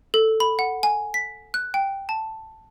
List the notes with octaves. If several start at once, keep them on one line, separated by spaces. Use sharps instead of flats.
A4
B5
F#5
G#5
B6
F#6
G5
A5